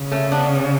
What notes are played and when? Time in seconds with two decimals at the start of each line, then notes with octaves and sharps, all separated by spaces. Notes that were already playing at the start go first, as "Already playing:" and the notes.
Already playing: C#3
0.11 A3 C#4
0.32 B3 D4